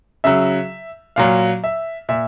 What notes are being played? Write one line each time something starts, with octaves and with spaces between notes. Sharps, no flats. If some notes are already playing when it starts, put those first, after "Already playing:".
C#3 F#3 E5
A#2 F#3 F5
E5
A#2 E5